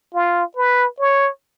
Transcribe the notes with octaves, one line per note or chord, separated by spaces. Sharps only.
F4
B4
C#5